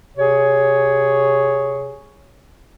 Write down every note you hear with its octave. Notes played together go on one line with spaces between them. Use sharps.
C3 G#4 C#5